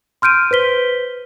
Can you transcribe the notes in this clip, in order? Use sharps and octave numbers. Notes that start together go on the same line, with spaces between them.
C6 F6 G6 D7 D#7
B4 C5 B6 G7